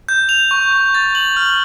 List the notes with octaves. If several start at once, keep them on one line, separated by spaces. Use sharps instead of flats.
G6
F7
C#6
C#6
A6
F#7
F6